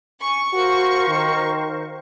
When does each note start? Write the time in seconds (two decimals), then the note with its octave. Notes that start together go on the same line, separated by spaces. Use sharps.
0.21 G#5 C#6
0.54 F#4 A#4 C5 F5
1.09 D#3